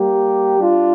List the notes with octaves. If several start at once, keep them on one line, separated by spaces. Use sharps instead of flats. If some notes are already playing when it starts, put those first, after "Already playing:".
Already playing: G3 A#3 G4
G3 D4 F4